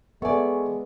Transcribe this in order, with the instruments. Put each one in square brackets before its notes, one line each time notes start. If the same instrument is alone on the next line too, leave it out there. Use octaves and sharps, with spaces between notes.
[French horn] G#3 [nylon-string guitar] B3 D5 [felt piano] A4 E5 [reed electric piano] G#5 C#6